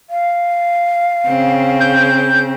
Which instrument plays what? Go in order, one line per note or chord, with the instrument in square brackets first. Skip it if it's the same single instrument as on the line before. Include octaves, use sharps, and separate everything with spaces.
[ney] F5
[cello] C#3 C4
[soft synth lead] G6